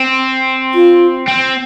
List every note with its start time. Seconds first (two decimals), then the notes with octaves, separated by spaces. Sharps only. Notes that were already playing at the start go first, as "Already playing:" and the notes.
Already playing: C4
0.75 F4
1.28 C4